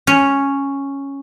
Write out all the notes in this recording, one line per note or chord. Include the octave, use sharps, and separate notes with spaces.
C#4